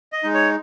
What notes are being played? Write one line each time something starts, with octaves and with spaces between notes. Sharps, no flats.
D#5
G#3 D#4
C#5